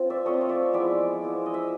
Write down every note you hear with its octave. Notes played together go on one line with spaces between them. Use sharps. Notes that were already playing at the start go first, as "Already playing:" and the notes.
Already playing: C4 F4
D5 E5
A3 C4 F4 C#5 D#5
F5
D5 E5
F3 G#3 B3 E4 D5 E5
F3 G#3 B3 E4
D#5
E5